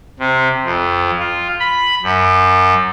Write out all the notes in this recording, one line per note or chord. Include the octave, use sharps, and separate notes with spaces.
C3
F2
F4
B5
F#2